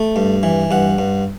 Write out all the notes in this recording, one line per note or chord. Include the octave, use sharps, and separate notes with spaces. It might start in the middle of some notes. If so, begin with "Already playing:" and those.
Already playing: A3
G2
E3
G2 F#5
G2